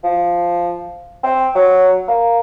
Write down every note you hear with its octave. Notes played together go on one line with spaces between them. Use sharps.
F3
C4
F#3
A#3